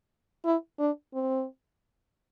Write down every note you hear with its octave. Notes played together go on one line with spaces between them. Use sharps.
E4
D4
C4